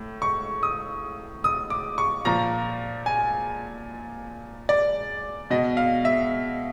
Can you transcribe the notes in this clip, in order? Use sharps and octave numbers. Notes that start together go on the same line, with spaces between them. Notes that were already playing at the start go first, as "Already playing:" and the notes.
Already playing: A2
C#6
D#6
D#6
D6
C#6
A#2 F3 A#5
G#5
D5
B2 D#5
F5
E5